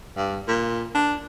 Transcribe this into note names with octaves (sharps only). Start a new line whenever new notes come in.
G2
A#2
D4